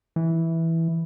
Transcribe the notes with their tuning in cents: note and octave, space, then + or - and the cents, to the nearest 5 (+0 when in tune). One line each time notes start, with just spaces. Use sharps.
E3 -5